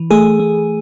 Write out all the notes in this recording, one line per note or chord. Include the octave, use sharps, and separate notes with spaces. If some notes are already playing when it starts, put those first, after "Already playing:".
Already playing: E3
A3 G#4
A3